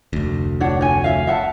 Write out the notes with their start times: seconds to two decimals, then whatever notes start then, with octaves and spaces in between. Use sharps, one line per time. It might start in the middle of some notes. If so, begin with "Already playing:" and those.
0.13 F1 D2
0.60 D4 C#5 F#5
0.81 C#5 G#5
1.04 E5 F5
1.27 E5 F#5 A5